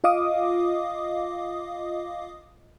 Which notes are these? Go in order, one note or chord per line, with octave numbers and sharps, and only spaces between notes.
F4 D#5 F5 D6 D#6